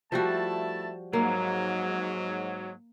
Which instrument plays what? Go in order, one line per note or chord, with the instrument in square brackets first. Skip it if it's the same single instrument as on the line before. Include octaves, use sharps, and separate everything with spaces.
[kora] F3 G3 F#4 [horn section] A3 E4 A5
[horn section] G#2 F#3 [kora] A#3